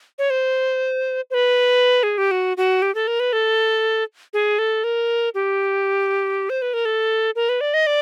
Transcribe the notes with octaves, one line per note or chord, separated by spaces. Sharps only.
C#5
C5
C5
B4
G#4
G4
F#4
F#4
G4
A4
A#4
B4
A4
G#4
A4
A#4
G4
C5
B4
A#4
A4
A#4
B4
D5
D#5
D5